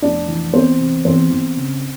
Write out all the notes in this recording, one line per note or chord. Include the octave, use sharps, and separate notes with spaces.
F1 D4 D5
E3
E2 C4 C5
C3
E2 C4 C5
E2
C#3